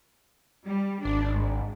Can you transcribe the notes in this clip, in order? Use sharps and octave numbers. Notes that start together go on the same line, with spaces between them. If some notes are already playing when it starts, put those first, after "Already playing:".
G3
G#1 D4
G#2